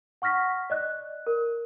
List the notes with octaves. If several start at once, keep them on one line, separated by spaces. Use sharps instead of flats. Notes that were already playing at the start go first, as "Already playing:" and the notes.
F#5 C#6 F6 A#6 B6
D5 D#5 F#6
A#4